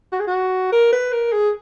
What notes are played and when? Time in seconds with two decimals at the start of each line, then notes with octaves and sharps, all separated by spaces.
0.12 F#4
0.20 G#4
0.27 F#4
0.72 A#4
0.93 B4
1.12 A#4
1.32 G#4